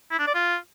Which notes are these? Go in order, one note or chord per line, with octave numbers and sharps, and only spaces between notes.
E4
D4
D5
F4